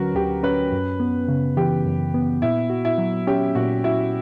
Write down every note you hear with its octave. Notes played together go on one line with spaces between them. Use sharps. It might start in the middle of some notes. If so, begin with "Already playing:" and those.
Already playing: D2 D3 F#3 C#4 F#4 A#4 B4
D2 G4
C#4 B4
F#2
B3
C#3
E3 G4
F#2
B3
A#2 E4
F#4
E4
F#3
C#4 G4
A#2 F#4
E4 F#4